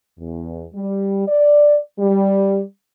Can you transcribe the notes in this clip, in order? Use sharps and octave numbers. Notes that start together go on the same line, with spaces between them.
E2
G3
D5
G3